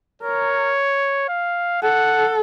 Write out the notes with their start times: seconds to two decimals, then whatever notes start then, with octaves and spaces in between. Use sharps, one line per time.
0.22 A#4 C#5
1.29 F5
1.82 A4 F#5